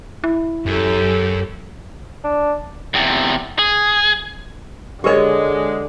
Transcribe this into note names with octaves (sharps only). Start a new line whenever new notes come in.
E4
F#2 G4 A4
D4
E2 C3
G#4
D3 G#3 G4 G#4 A#4 C#5 D#5